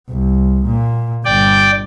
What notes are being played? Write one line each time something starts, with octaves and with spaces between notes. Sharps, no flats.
C2
A#2
G1 D5 G5